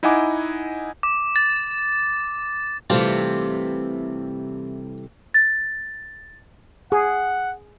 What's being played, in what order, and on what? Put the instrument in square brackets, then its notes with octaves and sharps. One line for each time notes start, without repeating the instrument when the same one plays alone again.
[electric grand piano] D#4 E4 D#5 F#5 G#5 D6
[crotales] D6
A6
[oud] C3 E3 [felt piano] G3 A3 [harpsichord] C4 D4 F4
[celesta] A6
[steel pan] G#4 [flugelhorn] F#5